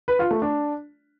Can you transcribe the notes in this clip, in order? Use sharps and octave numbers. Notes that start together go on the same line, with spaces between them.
B4
F4
A3
D4